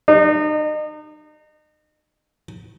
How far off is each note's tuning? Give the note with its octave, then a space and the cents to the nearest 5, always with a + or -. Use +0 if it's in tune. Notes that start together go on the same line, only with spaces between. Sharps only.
D#4 -35